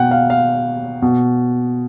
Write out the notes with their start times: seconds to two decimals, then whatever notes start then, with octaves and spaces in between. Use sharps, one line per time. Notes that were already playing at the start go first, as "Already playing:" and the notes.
Already playing: B2 F#5 G5
0.11 F5
0.30 F5
1.02 B2